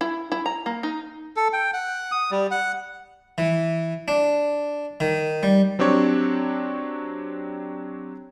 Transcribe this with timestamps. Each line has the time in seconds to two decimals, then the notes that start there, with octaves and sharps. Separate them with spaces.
0.01 E4
0.32 E4
0.46 A#5
0.66 A#3
0.83 D#4
1.36 A4
1.53 G5
1.73 F#5
2.12 D#6
2.31 G3
2.51 F#5
3.38 E3
4.08 D4
5.00 D#3
5.43 G3
5.79 F#3 C4 D4 G4 C#5